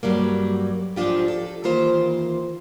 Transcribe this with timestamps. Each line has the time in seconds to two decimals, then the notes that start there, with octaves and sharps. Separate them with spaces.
0.03 G2 F#3 G3 A#3
0.96 G#2 F3 D4 F4 G4
1.28 A4
1.64 D#3 E3 A#3 F4 C5